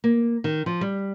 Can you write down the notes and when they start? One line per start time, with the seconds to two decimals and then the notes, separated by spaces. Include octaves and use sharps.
0.04 A#3
0.44 D#3
0.66 F3
0.81 G3